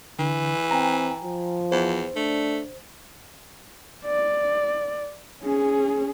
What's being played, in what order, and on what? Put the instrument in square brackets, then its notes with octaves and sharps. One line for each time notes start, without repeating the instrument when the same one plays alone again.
[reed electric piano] D3 [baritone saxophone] E3
[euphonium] C4 [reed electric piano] G5 G#5 A#5
[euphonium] F3
[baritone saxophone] E2 [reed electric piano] C5
[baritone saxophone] A3 [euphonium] D4
[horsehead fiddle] D5
C#4 G#4